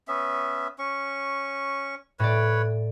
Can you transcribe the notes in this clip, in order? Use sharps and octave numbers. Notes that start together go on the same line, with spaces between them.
B3 C#4 E5
C#4 C#6
A2 B4 C#5 D5